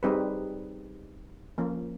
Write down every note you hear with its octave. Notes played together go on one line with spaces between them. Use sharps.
G3 C4 D#4 G#4 B4
F3 A#3 C#4